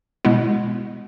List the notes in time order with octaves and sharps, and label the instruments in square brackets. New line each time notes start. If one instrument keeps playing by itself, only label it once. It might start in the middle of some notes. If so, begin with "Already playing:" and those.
[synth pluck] B2 G#3 B3 E4